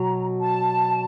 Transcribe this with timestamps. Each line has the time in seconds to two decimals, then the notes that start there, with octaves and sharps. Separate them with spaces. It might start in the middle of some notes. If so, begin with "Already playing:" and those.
Already playing: B2 F#3 A#5
0.41 A5